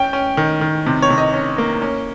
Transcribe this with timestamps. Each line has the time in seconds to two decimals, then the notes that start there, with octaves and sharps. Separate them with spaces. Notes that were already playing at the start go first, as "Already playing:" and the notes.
Already playing: C#4 G5
0.13 C#4
0.37 D#3
0.61 D#3
0.86 C3
1.02 C#5
1.10 C3
1.18 D#5
1.34 C#4
1.58 A#3
1.82 C#4